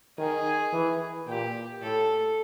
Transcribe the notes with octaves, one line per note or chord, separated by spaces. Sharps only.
D#3 G#4
E3
A#2 G4
A2 A4